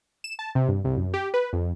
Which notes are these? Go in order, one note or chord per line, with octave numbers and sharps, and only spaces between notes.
E7
A5
C3
G2
C2
F#2
G4
B4
F2